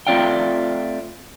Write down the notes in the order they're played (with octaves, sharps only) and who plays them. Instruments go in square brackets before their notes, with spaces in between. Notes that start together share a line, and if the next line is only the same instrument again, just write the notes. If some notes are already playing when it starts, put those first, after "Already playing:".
[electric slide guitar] A3 C4 F4 D5 F5 G5